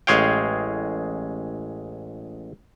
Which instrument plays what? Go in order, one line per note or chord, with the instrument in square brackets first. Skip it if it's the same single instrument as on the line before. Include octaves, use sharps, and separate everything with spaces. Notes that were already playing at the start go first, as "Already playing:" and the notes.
[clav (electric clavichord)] A1 G#3 G#4 C#5 F5 G5